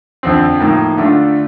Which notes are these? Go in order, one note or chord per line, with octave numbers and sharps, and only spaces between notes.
F2 D3 F3 C4
A2 F3 A#3 D#4
D3 A3 D4 F4